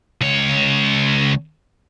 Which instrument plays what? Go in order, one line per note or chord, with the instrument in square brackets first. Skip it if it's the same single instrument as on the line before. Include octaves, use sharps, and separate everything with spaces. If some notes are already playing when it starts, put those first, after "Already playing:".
[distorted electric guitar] C#2 C#5